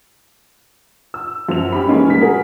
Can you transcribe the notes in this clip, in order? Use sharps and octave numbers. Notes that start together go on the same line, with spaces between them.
E6
F#2 F3 F7
C#4 G4 B5
E3 G#3 A#3 C#4 D#4
A#1 G3 A#3 B6
F#4 G#4 A#4